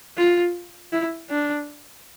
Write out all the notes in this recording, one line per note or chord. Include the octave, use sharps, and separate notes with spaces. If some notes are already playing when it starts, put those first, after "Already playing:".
F4
E4
D4